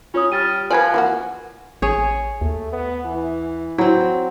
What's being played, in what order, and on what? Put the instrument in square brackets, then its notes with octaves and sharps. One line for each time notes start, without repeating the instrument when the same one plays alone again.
[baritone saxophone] C#4 [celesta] F4 C#5 D#6
[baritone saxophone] G3 [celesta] F6 A6 D#7
[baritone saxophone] F3 [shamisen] B4 C5 D5 [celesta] G#5 F#6 G#6
[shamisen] E3 A#3 F#4
[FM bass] A1 [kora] G#4 C#5
[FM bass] D#2 [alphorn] A3
[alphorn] B3
E3
[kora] F#3 C4 [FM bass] E4